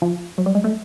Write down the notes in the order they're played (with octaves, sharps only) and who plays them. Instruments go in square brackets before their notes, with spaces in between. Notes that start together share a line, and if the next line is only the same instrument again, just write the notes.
[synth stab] F3
F#3
G3
G#3
A3